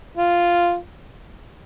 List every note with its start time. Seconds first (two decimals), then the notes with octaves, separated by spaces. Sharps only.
0.17 F4